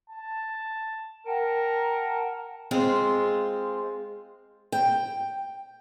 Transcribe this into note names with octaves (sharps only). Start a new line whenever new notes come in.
A5
A#4 F#5 G5 A5
G#3 C4 F4
G5